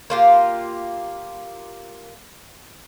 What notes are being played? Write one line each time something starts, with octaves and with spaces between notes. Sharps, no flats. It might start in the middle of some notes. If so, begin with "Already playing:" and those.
A#3 F4 G4